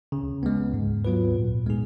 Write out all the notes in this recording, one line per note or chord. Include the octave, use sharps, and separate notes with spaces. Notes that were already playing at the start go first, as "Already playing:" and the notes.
C#3
G#3 B3
G#2
F#3 B3 F4 B4
A#2
G#3 B3 D#4 G#4